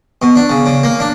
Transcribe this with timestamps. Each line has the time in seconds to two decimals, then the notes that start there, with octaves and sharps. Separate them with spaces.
0.22 B2
0.36 D4
0.49 C#3
0.66 C#3
0.83 A#3
1.00 D4